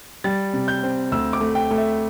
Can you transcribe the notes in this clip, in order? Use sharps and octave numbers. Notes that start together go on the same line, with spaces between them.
G3 A6
C3
G6
C4
D2 E6
D6
A3
G5
A3
E5